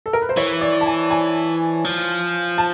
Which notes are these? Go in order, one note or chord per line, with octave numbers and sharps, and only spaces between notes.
A4
A#4
B4
C5
E3 C#5
D5
A5
G#5
G#5
F3
A5